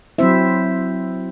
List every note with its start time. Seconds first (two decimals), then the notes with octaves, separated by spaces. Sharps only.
0.18 F#3 C4 E4 C5 E5